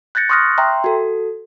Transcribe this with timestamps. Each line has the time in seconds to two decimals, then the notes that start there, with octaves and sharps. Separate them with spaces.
0.15 F#6 G6 A6 A#6 C#7
0.29 C6 C#6 D#6 F6 F#6 A#6
0.58 E5 G5 A#5 C6
0.84 F#4 A4